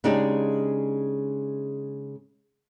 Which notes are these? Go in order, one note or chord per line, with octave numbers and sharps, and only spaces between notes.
C#3 G#3 D4 D#4 G4 G#4